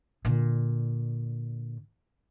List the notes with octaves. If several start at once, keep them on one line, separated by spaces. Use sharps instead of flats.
A#2 D3